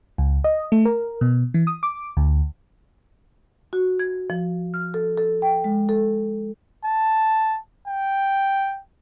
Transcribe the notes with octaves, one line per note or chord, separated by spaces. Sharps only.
C#2
D#5
A3
A#4
B2
E3
D#6
D6
D2
F#4
G#6
F3
F6
A4
A4
G5
G#3
A4
A5
G5